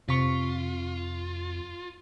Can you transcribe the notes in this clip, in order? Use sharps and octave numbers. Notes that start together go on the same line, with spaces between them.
F2 C3 F4 C#6 B6